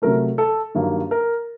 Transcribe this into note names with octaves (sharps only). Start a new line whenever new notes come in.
C3 F#3 A3 A#4
A4
G2 D#3 F#3 A#3
A#4